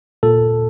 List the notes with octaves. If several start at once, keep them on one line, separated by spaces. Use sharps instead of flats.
A#2 A4